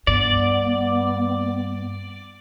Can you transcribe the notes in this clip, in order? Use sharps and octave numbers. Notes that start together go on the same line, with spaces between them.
G2 B3 D5